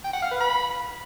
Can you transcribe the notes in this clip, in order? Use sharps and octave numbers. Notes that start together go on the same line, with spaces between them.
G5
F#5
F5
B4
B5